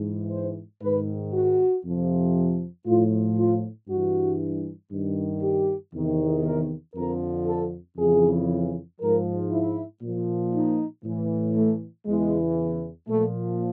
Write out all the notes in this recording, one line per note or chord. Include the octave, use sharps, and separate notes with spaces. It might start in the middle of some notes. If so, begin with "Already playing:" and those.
Already playing: G#2 E3
C5
G#2 D#3 B4
F#4
F2 C3 F3
A2 F3 F4
F4
G2 E3 F#4
G2 D#3
G4
E2 C3 D#3
A#4
F2 D3 F3 A#4
A4
F2 C#3 E3 G#4
G#2 F3 A#4
E4
A#2 F3
D#4
A2 E3
A3
E2 C#3 E3 G#3
A#2 F3 A3